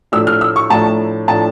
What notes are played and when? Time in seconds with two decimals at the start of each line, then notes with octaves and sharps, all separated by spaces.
0.12 A2 F3 A3 D4 E6
0.27 F6
0.41 E6
0.56 C#6
0.70 A2 F3 A3 D4 A5
1.28 A2 F3 A3 D4 A5